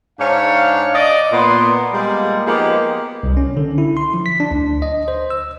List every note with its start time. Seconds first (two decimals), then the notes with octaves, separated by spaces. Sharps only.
0.19 G#2 D4 C#5 F5
0.94 D5 D#5
1.32 A#2 B3 C6
1.93 G3 G#3 A#3
2.46 F3 G#3 A#3 B3 D#4 G4
3.23 C2
3.37 C#4
3.57 D3
3.78 E4
3.97 C6
4.14 F3
4.26 B6
4.40 D4
4.51 D2
4.82 D#5
5.08 C5
5.30 E6